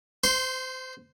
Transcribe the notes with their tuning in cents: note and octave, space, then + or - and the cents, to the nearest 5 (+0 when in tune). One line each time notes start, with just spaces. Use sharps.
C5 -25 C6 +0